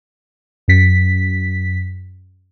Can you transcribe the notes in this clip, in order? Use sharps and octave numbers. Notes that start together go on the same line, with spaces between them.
F#2 B6